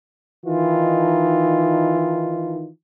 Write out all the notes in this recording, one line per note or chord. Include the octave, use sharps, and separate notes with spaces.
D#3 E3 D#4 F4